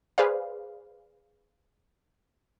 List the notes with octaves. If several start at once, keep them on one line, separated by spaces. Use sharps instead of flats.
G#4 B4 C5 D5 F5